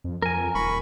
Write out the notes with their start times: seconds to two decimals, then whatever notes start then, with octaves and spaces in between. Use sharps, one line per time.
0.04 F2
0.22 F2 A#4 G#5
0.55 D#1 B5 C#6